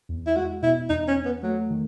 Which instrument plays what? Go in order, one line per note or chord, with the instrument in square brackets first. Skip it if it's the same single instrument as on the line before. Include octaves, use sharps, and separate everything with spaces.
[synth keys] E2
[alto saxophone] E4
[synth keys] G#3 [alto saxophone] F#4
[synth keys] B2 [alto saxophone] E4
[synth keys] E2 [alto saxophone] D#4
[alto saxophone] C#4
[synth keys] E2
[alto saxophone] B3
[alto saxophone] F#3 [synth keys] A3
[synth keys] D#3